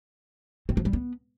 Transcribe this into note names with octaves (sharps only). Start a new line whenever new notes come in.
C4
F3
G3
B3